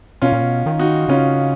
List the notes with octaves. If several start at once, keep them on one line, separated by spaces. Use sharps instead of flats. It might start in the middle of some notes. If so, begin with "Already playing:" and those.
B2 C#4 F4
A#2
B2
D#3
D#4 F#4
C#3 C#4 F4